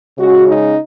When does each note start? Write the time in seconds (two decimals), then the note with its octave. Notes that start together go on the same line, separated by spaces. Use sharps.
0.18 C#3 G#3 C#4 F#4
0.48 D#4